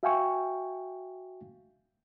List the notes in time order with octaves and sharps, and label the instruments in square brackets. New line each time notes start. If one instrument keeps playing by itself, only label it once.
[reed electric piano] F#4 E5 F5 G5 G#5 C#6